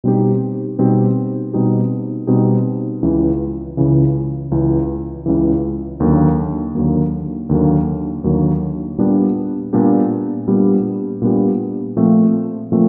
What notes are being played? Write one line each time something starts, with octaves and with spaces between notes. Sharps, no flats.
B2 G3 C4 D#4 G4
B2 G3 C4 D#4 G4
B2 G3 C4 D#4 G4
B2 G3 C4 D#4 G4
C#2 C#3 E3
C#2 C#3 E3
C#2 C#3 E3
C#2 C#3 E3
D#2 D3 F#3 A#3
D#2 D3 F#3 A#3
D#2 D3 F#3 A#3
D#2 D3 F#3 A#3
A#2 G3 B3 D4 G4
A#2 G3 B3 D4 G4
A#2 G3 B3 D4 G4
A#2 G3 B3 D4 G4
A#2 F3 A3 C4 F4
A#2 F3 A3 C4